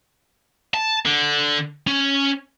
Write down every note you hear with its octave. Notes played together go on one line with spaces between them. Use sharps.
A5
D3
C#4